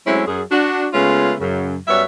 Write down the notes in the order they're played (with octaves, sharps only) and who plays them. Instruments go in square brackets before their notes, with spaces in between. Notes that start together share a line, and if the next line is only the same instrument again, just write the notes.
[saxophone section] F#3 G#3 A3 C4 C#4 E4
F#2 G#4
D4 F#4
C#3 G#3 A3 B3 C#4 F4
F#2 C#3
F#2 G3 B3 C#5 E5